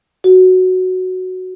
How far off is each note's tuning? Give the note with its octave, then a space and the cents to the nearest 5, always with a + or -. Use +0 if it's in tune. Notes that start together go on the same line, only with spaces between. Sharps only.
F#4 +0